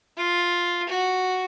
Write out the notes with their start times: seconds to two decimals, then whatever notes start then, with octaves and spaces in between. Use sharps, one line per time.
0.17 F4
0.89 F#4